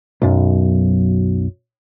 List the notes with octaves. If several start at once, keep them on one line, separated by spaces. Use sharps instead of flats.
B1 F#2